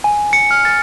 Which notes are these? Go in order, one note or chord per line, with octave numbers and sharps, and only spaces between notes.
G#5
C#7
F6
A6